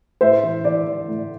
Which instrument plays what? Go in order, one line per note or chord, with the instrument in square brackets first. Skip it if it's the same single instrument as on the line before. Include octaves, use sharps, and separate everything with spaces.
[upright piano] A2 C5 E5
E3
E3 D5
E3
A2